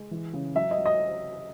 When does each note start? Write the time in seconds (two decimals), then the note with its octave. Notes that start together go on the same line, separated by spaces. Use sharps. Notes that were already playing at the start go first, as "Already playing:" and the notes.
Already playing: G#3
0.11 E3
0.33 C#3
0.55 F#3 E5
0.71 D#5
0.78 F#3
0.86 D#5